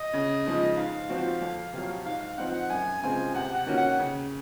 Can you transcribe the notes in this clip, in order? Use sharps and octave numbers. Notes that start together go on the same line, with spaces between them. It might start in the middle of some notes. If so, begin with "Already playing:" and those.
Already playing: D#5
C#3
F3 G#3 D#4
G#2 F5
F3 C4 F#4
F2
C3 F#3
G#2 F5
F5
F3 C4 D#4 F#5
F#5
F#2 G#5
C#3 G#3 C4 F4 G#5
C3 F#5
F#5
D#3 A#3 C#4 F#4
F#5
C#3